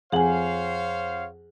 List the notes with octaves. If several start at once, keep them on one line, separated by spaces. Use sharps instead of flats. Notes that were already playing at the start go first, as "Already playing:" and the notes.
F2 G#4 C5 C#5 F5 F#5 G#5 F#7